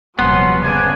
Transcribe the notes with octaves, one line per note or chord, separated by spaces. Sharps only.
D#1 C3 F3 F#3 B3 C#4 F#5 C6
G1 C#3 D4 C5 G#5